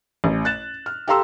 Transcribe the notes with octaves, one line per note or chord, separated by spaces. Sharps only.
A1
F#6 A6 E7
F6
G4 A4 F5 A#5 C6 E6